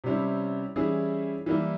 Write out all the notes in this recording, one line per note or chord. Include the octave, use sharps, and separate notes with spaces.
C3 G3 C#4 E4
E3 G3 C#4 E4 G#4
E3 G3 A#3 E4